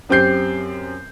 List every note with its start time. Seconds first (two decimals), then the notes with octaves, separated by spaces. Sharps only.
0.09 F#2 C4 G4 G6 C7